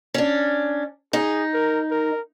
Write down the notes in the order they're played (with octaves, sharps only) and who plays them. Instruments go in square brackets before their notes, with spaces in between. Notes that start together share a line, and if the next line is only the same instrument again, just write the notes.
[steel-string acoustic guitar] C#4 D4
[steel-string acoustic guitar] D#4 [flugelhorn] G#4
[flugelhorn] A#4
A#4